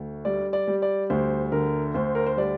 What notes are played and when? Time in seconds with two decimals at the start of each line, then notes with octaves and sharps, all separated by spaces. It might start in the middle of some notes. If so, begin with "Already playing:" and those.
Already playing: D2
0.25 G3 D5
0.53 D5
0.67 G3
0.82 D5
1.10 D2 C5
1.52 D3 A#4
1.94 D2 C5
2.15 A#4
2.26 C5
2.37 G3 D5